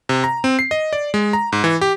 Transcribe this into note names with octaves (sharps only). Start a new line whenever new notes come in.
C3
A#5
C4
C7
D#5
D5
G#3
A#5
G#2
E3
G4